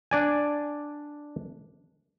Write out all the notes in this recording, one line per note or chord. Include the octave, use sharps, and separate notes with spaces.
D4 D5 G#5